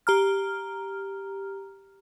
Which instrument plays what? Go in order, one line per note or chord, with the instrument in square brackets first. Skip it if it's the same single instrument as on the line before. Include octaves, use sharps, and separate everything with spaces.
[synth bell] G4 A#5 F6